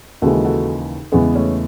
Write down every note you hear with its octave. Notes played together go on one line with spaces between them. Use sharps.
D#2 C#3 E3 G#3 F#4 A4
F#4 A4
E2 C#3 G#3 B3
A3 C#4